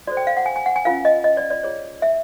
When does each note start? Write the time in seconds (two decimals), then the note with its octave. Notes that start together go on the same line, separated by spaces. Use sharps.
0.07 F#4 A4 C5 D5
0.17 G5
0.27 F5
0.37 F#5
0.46 G#5
0.56 G#5
0.66 F#5
0.76 G#5
0.85 C#4 F4 A#4 F5
1.05 D#5
1.24 D#5
1.37 D5
1.50 D5
1.63 F4 G#4 C#5
2.02 E5